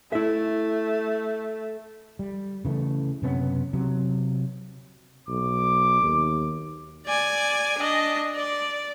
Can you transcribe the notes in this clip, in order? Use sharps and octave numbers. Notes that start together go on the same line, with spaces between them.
A3 E4 E5
G3
C#3 E3 G3 A3
F#2 C3 B3 C#4
C3 F#3
B1 D6
D#2
D5 G#5
D4 D#5
D5